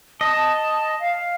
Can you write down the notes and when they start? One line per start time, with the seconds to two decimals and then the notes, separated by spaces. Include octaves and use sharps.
0.21 D#5 A5
1.00 F5